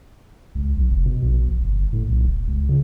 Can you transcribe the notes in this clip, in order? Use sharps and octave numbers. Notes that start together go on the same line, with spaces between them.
C#2
B1
F1
B2
A#1
A1
G1
A2
B1
D#1
C#2
C#3